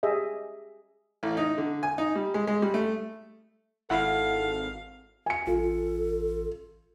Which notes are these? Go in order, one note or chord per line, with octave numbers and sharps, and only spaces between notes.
G4 G#4 D#5 E5
A1
D#4
D3
G#5
D#4
G3
G#3
G#3
G3
A3
G#1 E4 A4 F5 F#5
G#5 C#7
A1 F4 A4